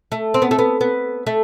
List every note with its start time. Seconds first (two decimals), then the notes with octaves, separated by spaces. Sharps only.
0.12 A3
0.34 C4
0.42 B3
0.51 A3
0.59 B3
0.81 B3
1.27 A3